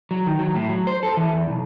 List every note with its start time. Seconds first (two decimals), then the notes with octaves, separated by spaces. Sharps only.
0.11 F#3
0.26 D#3
0.39 F#3
0.55 A2
0.69 F#3
0.87 C5
1.03 A4
1.17 E3
1.33 E2
1.50 B1